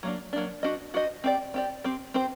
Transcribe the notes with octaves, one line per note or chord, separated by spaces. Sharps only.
F#3 A#3 D4
F#3 A#3 D4
D4 F#4 C5 D#5
D4 F#4 C5 D#5
C4 G4 D5
C4 G4 D5
C4 G4 C5
C4 G4 C5